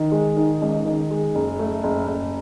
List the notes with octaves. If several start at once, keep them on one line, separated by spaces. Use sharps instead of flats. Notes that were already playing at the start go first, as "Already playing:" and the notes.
Already playing: D#3
G#3
D#3
C#2
D#3
G#3
F#1
A3
F#1
F#1